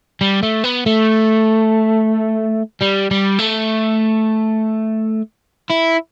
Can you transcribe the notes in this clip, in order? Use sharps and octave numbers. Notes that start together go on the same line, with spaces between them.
G3
A3
B3
A3
G3
G3
A3
E4